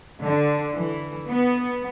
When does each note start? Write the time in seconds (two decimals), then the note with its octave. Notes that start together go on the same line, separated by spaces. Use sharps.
0.21 D3
0.75 E3
1.29 B3